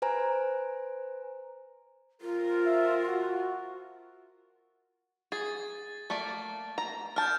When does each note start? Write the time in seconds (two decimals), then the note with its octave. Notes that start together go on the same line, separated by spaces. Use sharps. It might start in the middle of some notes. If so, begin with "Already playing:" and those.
0.02 B4 C5 G#5 A#5
2.21 F3 C4 F4 A#4
2.66 E5
3.08 F#4
5.32 G#4 A6
6.10 A3 A#3 D5
6.78 A#5
7.16 D4 A5 F6 G6